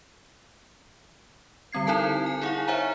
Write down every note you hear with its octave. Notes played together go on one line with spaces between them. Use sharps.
D3 G3 C4 G#6 C7
D#4 E4 A4 A#4 A5
G#5
D#4 E4 G#4 F5 F#5 C#6
C5 C#5 E5 F#5 G#5 A#5